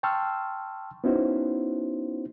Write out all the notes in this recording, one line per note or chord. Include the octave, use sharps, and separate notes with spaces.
G5 A5 C6 C#6 E6 F6
B3 C#4 D#4 E4 F#4 C5